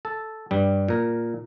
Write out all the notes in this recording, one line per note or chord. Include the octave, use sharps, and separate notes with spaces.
A4
G2 G3
A#2 A#4